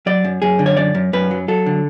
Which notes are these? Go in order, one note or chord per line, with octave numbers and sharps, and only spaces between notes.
F#3 D5
F#2
F#2 G#4
D3
C#5
F#2 D5
F#2
F#2 B4
F#3
F#3 A4
D3